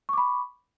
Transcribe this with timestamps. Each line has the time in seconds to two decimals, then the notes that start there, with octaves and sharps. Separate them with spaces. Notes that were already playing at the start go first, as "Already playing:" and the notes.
0.09 C#6
0.13 D6
0.18 B5